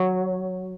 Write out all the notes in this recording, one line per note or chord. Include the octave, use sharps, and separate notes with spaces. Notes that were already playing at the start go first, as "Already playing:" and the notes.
Already playing: F#3